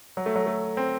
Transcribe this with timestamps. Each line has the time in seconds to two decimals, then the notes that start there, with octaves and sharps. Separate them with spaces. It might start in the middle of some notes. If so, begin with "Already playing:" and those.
0.17 F#3
0.26 A3
0.36 F#3
0.47 A3
0.77 C4